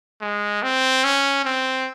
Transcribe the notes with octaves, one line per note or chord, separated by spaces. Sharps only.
G#3
C4
C#4
C4